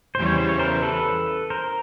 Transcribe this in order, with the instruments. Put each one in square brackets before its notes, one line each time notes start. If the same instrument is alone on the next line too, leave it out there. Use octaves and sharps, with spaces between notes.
[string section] E2 C#3 E3 G3 [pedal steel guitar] C5
[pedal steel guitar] C#5
C5
C#5
A#4 C5
A4 B4
A#4 C5